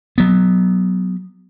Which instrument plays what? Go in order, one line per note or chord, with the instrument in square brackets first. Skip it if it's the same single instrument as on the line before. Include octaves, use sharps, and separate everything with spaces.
[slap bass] F#3 B3